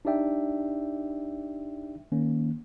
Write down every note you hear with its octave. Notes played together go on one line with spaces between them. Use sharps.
D4 D#4 G4 D5 E5 G5
D#3 A#3 C#4